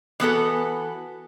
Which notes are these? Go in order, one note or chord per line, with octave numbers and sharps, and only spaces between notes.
E3 B3 F#4 A4